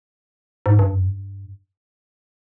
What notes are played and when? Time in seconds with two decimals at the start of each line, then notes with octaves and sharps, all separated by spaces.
0.66 G#2
0.79 G2
0.92 F#2
1.06 G2